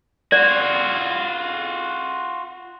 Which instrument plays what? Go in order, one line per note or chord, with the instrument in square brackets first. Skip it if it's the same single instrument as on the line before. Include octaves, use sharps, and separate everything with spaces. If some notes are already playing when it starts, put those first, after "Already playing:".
[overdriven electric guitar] F4 F#4 [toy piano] D5